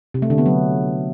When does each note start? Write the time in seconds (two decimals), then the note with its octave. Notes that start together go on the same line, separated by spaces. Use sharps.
0.14 C3
0.22 A3
0.30 D3
0.38 B3
0.46 F#3